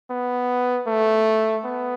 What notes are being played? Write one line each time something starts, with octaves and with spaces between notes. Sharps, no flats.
B3
A3
B3